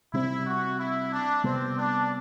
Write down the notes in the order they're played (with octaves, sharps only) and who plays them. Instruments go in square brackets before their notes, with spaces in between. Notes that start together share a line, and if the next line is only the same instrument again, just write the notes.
[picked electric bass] C3 G3 C4 [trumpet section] E4
[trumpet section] F#4
E4
D4
[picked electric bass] C3 G3 B3 [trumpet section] C4
[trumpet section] D4